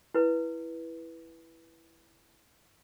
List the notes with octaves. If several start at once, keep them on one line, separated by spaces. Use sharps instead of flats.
E4 B4